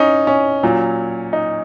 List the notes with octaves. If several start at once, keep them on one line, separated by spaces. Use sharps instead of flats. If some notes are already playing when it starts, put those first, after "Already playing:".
Already playing: C#4 D#4
C#4
A#2 F#3
D#4